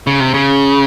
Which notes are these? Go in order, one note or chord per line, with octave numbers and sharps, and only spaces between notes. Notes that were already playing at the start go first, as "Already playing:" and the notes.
C#3
C3
C#3